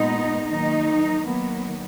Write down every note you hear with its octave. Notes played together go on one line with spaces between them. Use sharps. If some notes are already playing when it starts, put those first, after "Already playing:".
Already playing: A#2 G#3 B3 D#4
D#3 F#3 A#3 D#4
D#3 F#3 A#3 B3